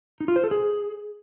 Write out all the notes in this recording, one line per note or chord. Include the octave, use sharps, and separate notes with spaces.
D#4
F4
C5
A4
G#4